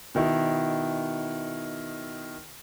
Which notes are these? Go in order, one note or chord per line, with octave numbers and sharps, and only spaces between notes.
B2 D#3 E4